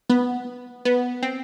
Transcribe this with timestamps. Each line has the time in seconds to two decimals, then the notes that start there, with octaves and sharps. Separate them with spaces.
0.10 B3
0.85 B3
1.22 C4